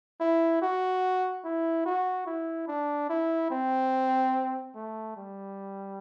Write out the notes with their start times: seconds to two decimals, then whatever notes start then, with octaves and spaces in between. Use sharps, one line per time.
0.20 E4
0.62 F#4
1.44 E4
1.86 F#4
2.26 E4
2.68 D4
3.10 E4
3.51 C4
4.75 A3
5.17 G3